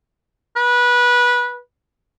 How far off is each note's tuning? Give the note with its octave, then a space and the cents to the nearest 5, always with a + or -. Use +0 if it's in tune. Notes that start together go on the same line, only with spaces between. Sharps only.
B4 -20